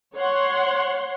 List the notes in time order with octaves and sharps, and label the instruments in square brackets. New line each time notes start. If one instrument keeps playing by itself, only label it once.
[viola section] C#5 F#5 C6